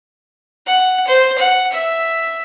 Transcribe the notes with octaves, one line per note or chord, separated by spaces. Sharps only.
F#5
C5
F#5
E5